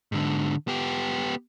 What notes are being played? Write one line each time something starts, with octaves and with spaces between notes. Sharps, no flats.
G#2 D3
B3 G4